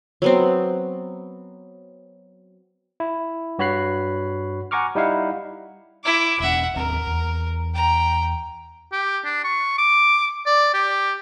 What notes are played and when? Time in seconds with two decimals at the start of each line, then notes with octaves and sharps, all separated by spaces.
0.22 F#3 B3 C4
3.00 E4
3.59 G2 F#4 C#5 B5 F#6 C7
4.71 F#5 G#5 A#5 C#6 D6 F6
4.95 G3 D#4 E4 F5 F#5
6.04 E4 D6
6.40 E1 C#4 E5 F#5
6.76 D#2 C4 D4 A#4
7.07 E2
7.74 G5 A#5
8.92 G4
9.25 D4
9.44 C#6
9.78 D6
10.46 D5
10.74 G4